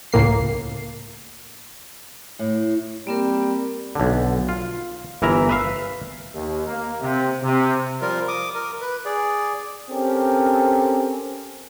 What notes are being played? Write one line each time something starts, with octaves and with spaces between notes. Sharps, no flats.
C#2 A2 A#3 C7
A2
G3 A#3 C4 A#4
B1 D3
F4
G1 E3 A#4 E5 A#5
B4 E5 F5
D#2
A#3
C3
C3
F3 G3 F4 A#4
D6 D#6
A#4
B4
G#4 D5
C4 C#4 G4 A4 A#4